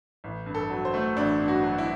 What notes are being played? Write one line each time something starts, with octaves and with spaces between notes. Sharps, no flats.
A1
G2
A4
F#3
C5
A3
A1 D4
G2
F#4
F#3
E4